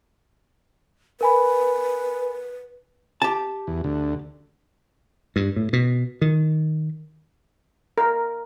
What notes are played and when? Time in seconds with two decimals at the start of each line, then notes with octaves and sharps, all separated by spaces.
1.21 A#4 B4 G#5 B5
3.22 G4 A5
3.67 E2
3.84 D2
5.36 G2
5.56 A2
5.73 B2
6.22 D#3
7.98 A#4